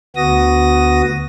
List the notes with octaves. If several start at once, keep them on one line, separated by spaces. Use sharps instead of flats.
D2 B3 F#4 D#6 A#6